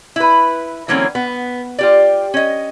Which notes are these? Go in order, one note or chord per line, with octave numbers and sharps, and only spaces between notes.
E4 B4
D3 E3 F#3 A#3 C4 C#4
B3
F4 G4 D5
C#4 D#5